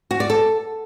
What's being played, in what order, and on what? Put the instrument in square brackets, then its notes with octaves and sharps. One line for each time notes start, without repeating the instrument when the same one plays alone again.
[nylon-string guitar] F#4
D5
A4